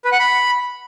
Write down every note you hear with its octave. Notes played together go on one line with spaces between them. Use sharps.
B4
F#5
B5